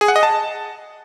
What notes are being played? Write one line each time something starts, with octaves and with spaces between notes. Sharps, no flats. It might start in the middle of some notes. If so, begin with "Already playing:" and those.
G#4
F#5
D#5
A5